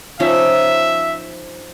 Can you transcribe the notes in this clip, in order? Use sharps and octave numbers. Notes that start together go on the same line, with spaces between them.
F3 C#4 D#4 E5